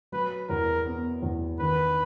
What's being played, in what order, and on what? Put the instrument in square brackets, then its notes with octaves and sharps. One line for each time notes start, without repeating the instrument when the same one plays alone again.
[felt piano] F#3 [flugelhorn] B4
[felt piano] E2 [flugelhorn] A#4
[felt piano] B3
E2
[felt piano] D#3 [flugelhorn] B4